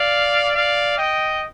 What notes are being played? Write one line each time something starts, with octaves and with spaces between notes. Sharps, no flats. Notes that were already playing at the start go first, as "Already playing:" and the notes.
Already playing: D5 F5
D5 F5
D#5 G5